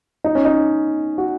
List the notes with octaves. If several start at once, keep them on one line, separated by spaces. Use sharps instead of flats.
D#4
C#4
D#4
F#4